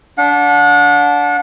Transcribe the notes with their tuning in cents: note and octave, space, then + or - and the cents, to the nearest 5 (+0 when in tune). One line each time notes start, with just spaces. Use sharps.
D4 -20 F#5 -35